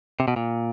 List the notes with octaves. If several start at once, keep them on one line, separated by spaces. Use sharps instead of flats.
C3
B2
A#2